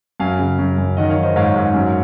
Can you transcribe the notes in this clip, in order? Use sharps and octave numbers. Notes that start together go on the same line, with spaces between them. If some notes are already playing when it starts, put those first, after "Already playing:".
F#2 F5 G#5
C#3
F#2
F#2
D#3 D#5 F#5
C#5 F5
D#3
C5 D#5
G#2 C#5 F5
G#2
F#2